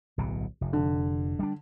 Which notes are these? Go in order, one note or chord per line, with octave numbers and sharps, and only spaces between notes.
D1 B1 B2
F1
D3
G3 D4